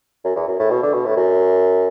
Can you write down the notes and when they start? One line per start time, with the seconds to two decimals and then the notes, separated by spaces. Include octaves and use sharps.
0.25 F#2
0.36 E2
0.48 F#2
0.59 A2
0.71 B2
0.83 D3
0.94 B2
1.06 A2
1.17 F#2